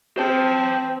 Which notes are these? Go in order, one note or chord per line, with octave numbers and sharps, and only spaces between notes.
C4 C5 A5